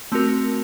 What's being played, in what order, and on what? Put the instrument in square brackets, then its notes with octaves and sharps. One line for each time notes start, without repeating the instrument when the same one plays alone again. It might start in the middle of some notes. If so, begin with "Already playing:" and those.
[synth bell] A3 C4 F#4 A#4